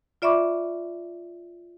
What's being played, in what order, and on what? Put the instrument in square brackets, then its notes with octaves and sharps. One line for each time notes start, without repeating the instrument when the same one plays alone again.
[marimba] F4 D5 E5 B5 C#6 D6